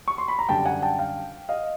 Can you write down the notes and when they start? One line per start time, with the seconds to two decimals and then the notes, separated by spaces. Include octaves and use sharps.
0.08 C#6
0.18 C6
0.28 B5
0.39 A#5
0.49 F#2 D3 G3 G5 A5
0.65 F#5 G#5
0.83 G5 A5
0.99 F5 G5
1.49 D#5 F5